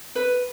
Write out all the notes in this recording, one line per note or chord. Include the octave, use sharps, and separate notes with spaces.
B4